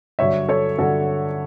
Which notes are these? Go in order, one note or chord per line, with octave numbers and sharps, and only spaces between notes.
G2 D3 F#3 C#5 E5
A4 C#5
G2 D3 F#3 F#4 A4